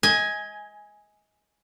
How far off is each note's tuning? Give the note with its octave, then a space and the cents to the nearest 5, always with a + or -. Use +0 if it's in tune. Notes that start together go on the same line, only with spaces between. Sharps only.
D#5 +30 G#5 +0